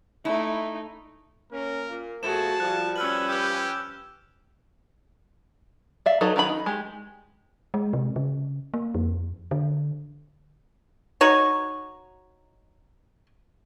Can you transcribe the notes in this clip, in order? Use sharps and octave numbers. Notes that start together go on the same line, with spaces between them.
A3 D#4 E4
A#3 C#4 A#4
A#2 A#3
B2 F3 A3 F#4 G#4 A5 E7
F3 G3 F#6
C#4 B4 E6 F6 F#7
G4 E6 G6
D5 E5 F5
F#3 D#4 A4 B4
D#3 F#3 D#4 B5
D#4
G#3 G4
G#3
C3
C#3
A#3
F2
D3
D#4 F#4 C#5